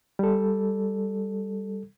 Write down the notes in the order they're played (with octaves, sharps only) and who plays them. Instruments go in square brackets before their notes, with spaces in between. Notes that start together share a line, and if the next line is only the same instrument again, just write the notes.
[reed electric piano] G3 A4